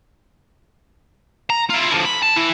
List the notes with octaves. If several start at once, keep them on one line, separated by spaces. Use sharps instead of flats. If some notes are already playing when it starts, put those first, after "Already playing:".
A#5
E4 F4
D3 F3
B5
A5
E3 E4